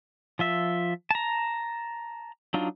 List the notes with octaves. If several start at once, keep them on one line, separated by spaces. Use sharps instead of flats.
F3 F4 E5
A5 A#5
F#3 D4 D#4 F4